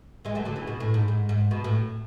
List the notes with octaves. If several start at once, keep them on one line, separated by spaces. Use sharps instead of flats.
E3 G#3
F#3 A3
D3 F#3
C#3 E3
B2
A2
G#2
G#2
G#2
B2
A2